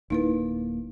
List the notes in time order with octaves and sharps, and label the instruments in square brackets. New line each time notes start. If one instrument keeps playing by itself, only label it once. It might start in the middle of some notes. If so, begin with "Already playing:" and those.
[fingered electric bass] D1 A#3 [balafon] D#4 E4 B4